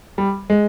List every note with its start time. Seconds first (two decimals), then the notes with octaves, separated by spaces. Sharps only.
0.18 G3
0.50 G#3